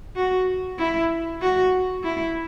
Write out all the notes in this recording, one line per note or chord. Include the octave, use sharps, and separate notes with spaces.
F#4
E4
F#4
E4